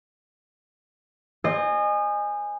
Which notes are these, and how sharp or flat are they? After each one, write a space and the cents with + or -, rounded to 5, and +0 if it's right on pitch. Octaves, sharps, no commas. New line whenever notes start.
C5 +5 D#5 -30 G#5 -10